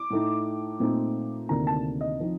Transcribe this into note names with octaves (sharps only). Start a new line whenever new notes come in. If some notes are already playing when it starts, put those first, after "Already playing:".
Already playing: D6
A2 A3 D#4
A#2 A3 C4 D#4
D2 C3 D#3 A#3 D4 A#5
A5
D#5
F3 C4 D#4